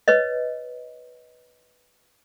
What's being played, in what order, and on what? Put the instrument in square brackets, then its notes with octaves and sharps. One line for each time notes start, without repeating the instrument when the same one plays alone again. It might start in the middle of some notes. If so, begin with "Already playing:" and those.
[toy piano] B4 C#5 D#5